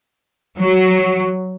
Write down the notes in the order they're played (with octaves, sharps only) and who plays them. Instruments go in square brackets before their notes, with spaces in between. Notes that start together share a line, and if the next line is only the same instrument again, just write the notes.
[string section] F#3